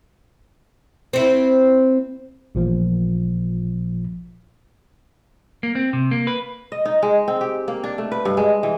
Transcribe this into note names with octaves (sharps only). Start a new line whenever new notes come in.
C4 E4
A1 A#2 F3
A#3
C4
C3
A#3
B4
D#5
D#4
G#3
C4
G4
A#3
D4
A3
B4
G2
G#3
E3